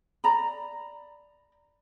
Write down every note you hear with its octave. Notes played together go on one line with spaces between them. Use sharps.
D5 A#5 B5